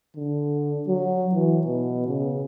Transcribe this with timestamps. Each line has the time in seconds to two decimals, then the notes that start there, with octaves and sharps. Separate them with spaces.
0.17 D3
0.88 F#3
1.34 E3
1.66 B2
2.08 C#3